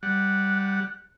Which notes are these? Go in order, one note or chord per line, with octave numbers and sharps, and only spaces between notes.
G3 F#5 F#6